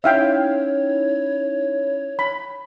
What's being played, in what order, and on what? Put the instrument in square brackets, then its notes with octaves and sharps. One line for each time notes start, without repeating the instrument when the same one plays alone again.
[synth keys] C#4 D#4 E4 [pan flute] C#5 [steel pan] E5 F5 G5
[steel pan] B5